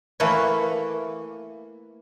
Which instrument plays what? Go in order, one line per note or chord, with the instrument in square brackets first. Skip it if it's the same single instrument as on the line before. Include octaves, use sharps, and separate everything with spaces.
[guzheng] E3 A3 A#3 A4 B4 C#5